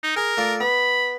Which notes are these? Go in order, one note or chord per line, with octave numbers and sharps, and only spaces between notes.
D#4
G#4 A#4
A3 F4 D5
B3 B5